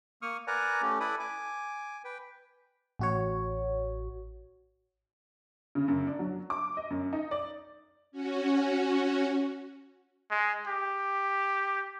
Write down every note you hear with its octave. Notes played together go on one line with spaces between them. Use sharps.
A#3 C#6 D#6 F6
A#4 B4 D5 F#5 G#5 A#5
A3 C#4 G4
E4 A4 B4 D5 B5 D#6
G#5 D6
B4 G5
A1 F#4 C#5
C#3
F#2
D4
F#3
D6
D#5
F#2
D#4
D5
C#4 F#4
G#3
G4